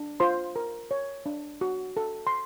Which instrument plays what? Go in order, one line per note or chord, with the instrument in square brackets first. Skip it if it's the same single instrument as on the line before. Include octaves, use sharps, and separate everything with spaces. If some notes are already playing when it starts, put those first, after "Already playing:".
Already playing: [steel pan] D4
F4 C5 C6
A#4
C#5
D4
F#4
A4
C6